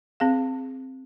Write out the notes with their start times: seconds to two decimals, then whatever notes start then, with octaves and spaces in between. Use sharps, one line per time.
0.20 C4 G#4 F5